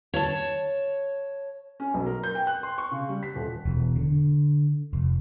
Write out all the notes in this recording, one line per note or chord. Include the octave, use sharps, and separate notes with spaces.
C#5 A5
C#4
B1
A#4
G6
G5
F#6
C6
C#6
C#3
G3
B6
D#1
E1
D3
F1